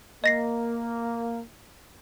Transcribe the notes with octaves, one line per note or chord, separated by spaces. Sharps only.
A#3 D#5 A#6 C7